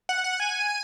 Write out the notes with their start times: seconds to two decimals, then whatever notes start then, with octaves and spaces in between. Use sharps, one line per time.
0.09 F#5
0.24 F#5
0.40 G#5